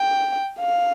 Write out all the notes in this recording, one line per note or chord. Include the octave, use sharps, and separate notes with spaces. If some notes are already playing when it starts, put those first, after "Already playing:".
Already playing: G5
F5